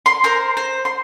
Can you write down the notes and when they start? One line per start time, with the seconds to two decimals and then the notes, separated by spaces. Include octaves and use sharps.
0.06 C6
0.24 A#4 C5 C6
0.57 C5
0.85 C6